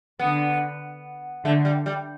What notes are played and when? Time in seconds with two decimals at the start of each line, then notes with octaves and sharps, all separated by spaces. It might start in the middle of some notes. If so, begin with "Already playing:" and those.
0.19 D3 B3
1.45 D3 A3
1.65 G3
1.86 G3